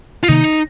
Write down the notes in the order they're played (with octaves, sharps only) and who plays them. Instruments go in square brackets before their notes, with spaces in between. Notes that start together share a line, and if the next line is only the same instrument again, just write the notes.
[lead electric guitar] F4
[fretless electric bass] C3 D#3 A#3 [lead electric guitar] D#4